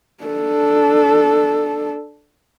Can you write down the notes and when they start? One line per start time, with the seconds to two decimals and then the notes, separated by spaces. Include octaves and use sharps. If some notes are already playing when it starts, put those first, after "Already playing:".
0.24 D4 A4